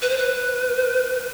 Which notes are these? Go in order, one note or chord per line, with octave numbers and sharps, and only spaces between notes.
B4
C5
B4